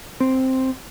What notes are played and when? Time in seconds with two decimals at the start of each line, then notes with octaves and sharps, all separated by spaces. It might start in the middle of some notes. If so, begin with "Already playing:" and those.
0.20 C4